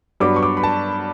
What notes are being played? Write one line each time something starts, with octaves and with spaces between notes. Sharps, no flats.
G2 F#3 B3 D4 D6
C#6
D6
B5
A5